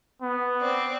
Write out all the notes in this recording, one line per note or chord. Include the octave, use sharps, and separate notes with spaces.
B3
C4 D5